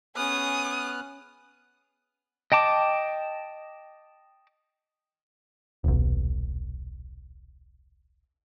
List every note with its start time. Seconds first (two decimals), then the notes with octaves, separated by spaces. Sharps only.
0.16 B3 C#4 G#4 D#6 F6 F#6
2.52 D#5 G5 A5 D6
5.84 D#1 B1